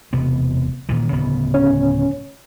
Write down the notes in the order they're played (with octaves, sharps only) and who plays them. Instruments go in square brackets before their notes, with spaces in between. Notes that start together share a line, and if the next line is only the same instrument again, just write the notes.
[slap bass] E1 C3 B3
A#2 D#3 E3
D1 C#3 B3
[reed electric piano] C#4 C#5